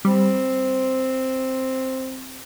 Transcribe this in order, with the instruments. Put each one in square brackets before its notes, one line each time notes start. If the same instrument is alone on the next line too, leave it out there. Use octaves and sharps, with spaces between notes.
[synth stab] G3 [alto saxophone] C4